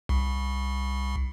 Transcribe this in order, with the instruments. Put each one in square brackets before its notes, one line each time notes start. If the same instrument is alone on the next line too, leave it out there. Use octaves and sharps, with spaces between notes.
[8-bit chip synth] C2